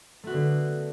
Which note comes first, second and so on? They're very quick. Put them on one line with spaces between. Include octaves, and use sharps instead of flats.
A3 F#4 B3 D3